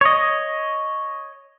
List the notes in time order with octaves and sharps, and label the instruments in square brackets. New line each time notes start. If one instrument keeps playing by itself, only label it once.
[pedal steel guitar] C#5 D#5